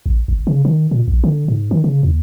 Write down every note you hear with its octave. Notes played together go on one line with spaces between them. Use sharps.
A1
G1
C#3
D#3
A#2
A#1
D3
G#2
D#3
C#3
D#2